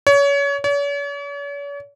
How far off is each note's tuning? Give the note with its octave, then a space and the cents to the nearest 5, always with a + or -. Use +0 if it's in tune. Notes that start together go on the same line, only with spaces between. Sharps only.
C#5 +30
C#5 +45